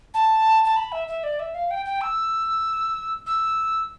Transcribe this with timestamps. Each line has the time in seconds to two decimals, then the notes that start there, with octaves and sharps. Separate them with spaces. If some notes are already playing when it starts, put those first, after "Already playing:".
0.14 A5
0.65 A5
0.77 B5
0.92 E5
1.08 E5
1.23 D5
1.39 E5
1.55 F5
1.71 G5
1.86 G5
2.01 E6
3.26 E6